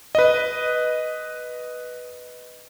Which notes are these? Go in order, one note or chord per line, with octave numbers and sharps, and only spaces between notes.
B4 D#5